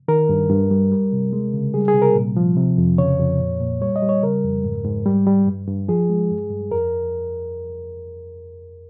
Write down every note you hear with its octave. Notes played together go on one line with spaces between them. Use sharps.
D#3 A#4
G2
G2
G3
G3
C3
G#3
C#3
G3 G#4
G#4
C3
A#4
A#2
F3
C3
F2
C#3 C#5
F2
A#2
A#2
G3 C#5
D#5
G3
C#5
C#3 A#4
F2
G#2
G#2
G3
G3
G2
G2
F3 G#4
G#3
G2
G2
F2 A#4